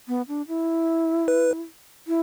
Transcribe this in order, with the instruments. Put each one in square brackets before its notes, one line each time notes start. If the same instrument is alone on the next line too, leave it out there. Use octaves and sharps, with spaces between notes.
[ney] B3
D4
E4
[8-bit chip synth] B4
[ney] E4